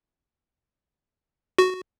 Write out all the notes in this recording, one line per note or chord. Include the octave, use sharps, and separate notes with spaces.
F#4